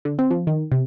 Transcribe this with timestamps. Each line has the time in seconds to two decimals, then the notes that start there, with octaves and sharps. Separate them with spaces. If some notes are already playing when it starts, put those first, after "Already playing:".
0.05 D3
0.19 C4
0.31 F3
0.47 D#3
0.72 C3